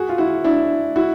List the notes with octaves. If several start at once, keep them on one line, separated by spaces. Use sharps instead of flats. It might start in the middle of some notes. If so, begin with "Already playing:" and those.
Already playing: F#4 G#4
F4
E4 F#4
D4 E4
E4 F#4